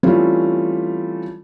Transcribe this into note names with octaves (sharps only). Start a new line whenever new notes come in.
E3 G3 A3 C4 C#4 F4